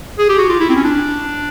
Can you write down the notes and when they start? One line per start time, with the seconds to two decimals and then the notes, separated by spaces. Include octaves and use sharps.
0.18 G#4
0.29 G4
0.39 F#4
0.49 F4
0.60 E4
0.69 C4
0.76 C#4
0.84 D4